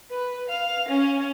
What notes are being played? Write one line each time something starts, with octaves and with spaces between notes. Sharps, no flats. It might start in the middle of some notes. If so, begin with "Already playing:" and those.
B4
F5
C#4